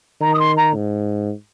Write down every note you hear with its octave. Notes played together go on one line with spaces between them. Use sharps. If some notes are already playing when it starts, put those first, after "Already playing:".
D#3 A#5
D#6
C6
A#5
G#2